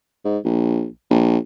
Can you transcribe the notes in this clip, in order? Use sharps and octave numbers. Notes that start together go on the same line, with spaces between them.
G#2
A#1
A#1